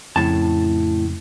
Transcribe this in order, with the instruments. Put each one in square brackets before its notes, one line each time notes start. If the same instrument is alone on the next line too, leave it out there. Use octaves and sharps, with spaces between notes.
[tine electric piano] F2 C#3 [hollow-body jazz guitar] A2 A5